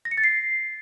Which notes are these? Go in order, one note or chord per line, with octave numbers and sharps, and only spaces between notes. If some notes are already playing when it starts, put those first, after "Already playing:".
A#6
C#7
A6
C7